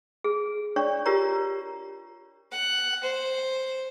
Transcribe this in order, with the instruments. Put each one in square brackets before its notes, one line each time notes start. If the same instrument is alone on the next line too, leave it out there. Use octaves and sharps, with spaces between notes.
[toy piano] G#4
D4 C#5 D5 C#6
F4 G4 A#4 C#5 A#5
[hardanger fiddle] F#5
C5